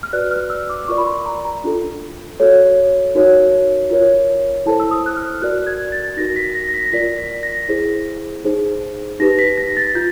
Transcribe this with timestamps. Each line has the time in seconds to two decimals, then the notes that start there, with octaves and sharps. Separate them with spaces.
0.03 F6
0.13 F#4 B4 D5 F#6
0.31 F6
0.50 E6
0.70 D6
0.88 F4 A#4 D5 C#6
0.98 B5
1.07 C6
1.26 A#5
1.45 A#5
1.64 D4 F4 A4
2.40 F#4 A4 C#5
3.15 D#4 F#4 A#4 C#5
3.91 F4 A#4 C#5
4.66 E4 A4 C5 A5
4.80 E6
4.91 D#6
5.06 F#6
5.17 F6
5.42 F#4 A#4 D5 F#6
5.67 G#6
5.92 A6
6.17 D#4 F#4 A#4 A#6
6.36 B6
6.55 A#6
6.69 A#6
6.74 B6
6.86 A#6
6.93 F4 A#4 D5 B6
7.18 B6
7.43 A#6
7.69 E4 G#4 C5
8.45 D#4 G#4 C5
9.20 D#4 G4 B4 A#6
9.39 B6
9.58 A#6
9.77 A6
9.95 F4 G6